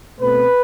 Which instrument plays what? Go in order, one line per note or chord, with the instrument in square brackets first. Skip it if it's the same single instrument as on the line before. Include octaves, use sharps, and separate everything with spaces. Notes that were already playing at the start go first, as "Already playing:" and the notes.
[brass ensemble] B2 A3 C4 B4